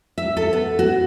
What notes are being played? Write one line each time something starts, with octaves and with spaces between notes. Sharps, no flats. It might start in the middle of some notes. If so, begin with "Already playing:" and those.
E5
A4
B3
F#4